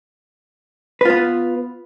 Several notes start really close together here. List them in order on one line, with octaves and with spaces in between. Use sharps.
B4 F4 B3